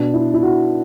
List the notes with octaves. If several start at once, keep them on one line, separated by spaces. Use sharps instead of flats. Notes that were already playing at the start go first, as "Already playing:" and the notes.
Already playing: B2 D4
E4
E4
F#4